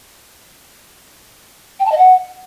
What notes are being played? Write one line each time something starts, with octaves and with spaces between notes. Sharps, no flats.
G5
A5
D#5
F#5